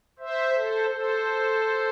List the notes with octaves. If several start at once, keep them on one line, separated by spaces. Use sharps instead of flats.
C5 E5
A4 C5
A4 C5